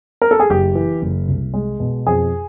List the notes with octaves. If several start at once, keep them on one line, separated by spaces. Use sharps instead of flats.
A#4
A4
G#4
F#1 G4
E3
F#1
C2
G#3
B2
F2 G#4